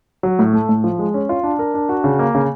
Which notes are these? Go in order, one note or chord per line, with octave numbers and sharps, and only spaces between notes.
F#3
A2
A3
A2
F3
G#3
C#4
F4
D4
A#4
D4
F#4
C#3
A#3
C#3